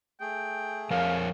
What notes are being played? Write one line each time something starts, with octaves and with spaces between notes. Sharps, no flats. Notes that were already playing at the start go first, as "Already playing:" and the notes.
A3 G#4 G5
F3 A#4 C#5 F5